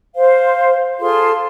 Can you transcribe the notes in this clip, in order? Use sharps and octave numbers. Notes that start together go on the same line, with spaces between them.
C5 F5
F4 G#4 A4 C6